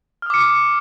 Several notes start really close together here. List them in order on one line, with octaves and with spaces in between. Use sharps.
F6 D#6 D6 C#7